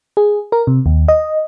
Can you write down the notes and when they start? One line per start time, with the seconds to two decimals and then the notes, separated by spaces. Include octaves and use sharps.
0.17 G#4
0.52 A#4
0.67 C3
0.86 D#2
1.08 D#5